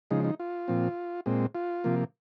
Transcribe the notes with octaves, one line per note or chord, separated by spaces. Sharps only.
C#3 F3 G#3 D#4
D#4
F4
A#2 F3 C4
A#2 G#3 C4
F4
C3 F3 A#3